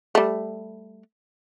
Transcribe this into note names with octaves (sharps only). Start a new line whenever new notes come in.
G3 A3